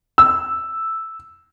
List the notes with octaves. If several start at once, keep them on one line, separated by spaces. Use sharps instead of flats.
E6